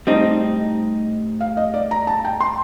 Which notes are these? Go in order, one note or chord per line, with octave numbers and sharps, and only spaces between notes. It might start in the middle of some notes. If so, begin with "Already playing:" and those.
A2 G3 C4 D#4 D#5
F5
D#5
D5
A#5
A5
G5
C6